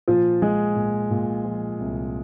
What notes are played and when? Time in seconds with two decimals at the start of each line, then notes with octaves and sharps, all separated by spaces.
0.08 A#2 F3 F4
0.42 F3 G#3 G#4
0.76 A#2
1.11 A#2
1.45 F3
1.80 C2